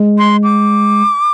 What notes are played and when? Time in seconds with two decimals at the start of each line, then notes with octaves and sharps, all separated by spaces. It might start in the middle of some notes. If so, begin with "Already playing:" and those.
Already playing: G#3
0.18 C6
0.43 D6